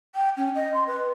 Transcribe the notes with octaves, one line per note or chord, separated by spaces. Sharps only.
G5
C#4
D#5
C6
B4